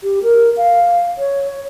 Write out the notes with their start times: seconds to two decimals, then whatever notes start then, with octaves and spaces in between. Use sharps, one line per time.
0.03 G4
0.23 A#4
0.57 F5
1.18 C#5